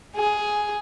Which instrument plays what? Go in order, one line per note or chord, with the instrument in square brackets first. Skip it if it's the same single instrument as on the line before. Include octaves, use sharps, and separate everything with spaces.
[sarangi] G#4